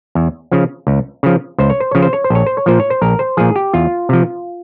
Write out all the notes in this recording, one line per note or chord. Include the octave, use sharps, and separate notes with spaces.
E2
C#3 F3
C#2
C#3 F3
C#2 C5
C#5
C5
C#3 F3 C#5
C5
C#5
C5
A#1 C#5
C5
C#5
A#2 F3 C5
C#5
C5
A#1 A#4
C5
A#2 F3 G#4
G4
E2 F4
C3 F3